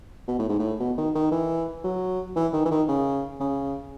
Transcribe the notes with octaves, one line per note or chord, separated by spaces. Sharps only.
B2
A2
G#2
A2
B2
D#3
D#3
E3
F#3
E3
D#3
E3
D#3
C#3
C#3